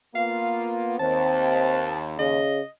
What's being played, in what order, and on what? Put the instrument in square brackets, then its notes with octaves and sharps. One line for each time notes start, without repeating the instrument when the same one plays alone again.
[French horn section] A#3 B3 F4 [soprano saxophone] F5
[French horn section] D#2 [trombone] C4 [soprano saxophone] A5
[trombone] C#3 [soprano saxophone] D#5